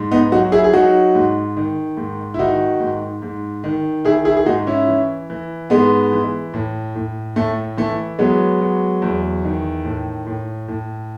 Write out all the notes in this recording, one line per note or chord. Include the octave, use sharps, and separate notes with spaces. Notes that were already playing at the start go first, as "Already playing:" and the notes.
Already playing: G#2
B3 D#4
F#3 D#4 F#4
E4 G#4
G#4
F#3 D#4 F#4
G#2
D#3
G#2
E4
D#3 D#4 F#4
G#2
G#2
D#3
D#3 E4 G#4
E4 G#4
G#4
G#2 D#4 F#4
C#4 E4
E3
E3
G#2 G#3 B3
E3
A2
A2
A2 A3
E3 A3
F#3 G#3 B3
F#3
E2
D#3
A2
A2
A2